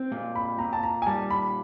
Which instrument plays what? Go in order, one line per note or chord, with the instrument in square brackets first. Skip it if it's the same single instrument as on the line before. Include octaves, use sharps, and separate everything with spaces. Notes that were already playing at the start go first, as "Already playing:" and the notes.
Already playing: [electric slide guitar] C4
A#2
[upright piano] B5
[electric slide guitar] A#2 [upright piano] A#5
[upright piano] A5
A#5
G#5
[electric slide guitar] G3 [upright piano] A5
[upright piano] B5